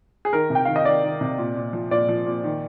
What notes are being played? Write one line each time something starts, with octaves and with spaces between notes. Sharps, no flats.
G#4
D#3 A#4
C3
G5
D#3 F5
D#5
D#3 D5
D#3
C3
A#2
A#2
F3
A#2 D5
F3
A#2
D#3